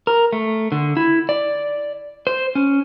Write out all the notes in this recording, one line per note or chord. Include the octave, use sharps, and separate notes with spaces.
A#4
A3
D3
E4
D5
C5
C#4